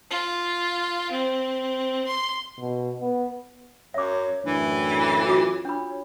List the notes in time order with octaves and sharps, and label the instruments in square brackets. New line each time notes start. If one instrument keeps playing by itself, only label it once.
[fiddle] F4
C4
C6
[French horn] B2
B3
[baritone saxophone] F#2 [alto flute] C#5 [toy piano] E5 D6
[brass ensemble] F#2 A2 [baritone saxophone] E3 [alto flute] D4
[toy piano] F4 F#4 D6 [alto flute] C#5
[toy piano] D4 B5